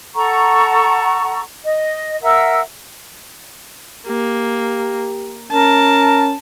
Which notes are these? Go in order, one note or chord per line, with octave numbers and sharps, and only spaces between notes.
A4 F#5 A#5 C#6
D#5
A#4 E5 F#5 E6
A#3 G4
C#4 A#4 A5